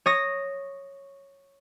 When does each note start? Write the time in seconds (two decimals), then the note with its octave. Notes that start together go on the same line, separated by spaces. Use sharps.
0.06 C#5 D#6 A#6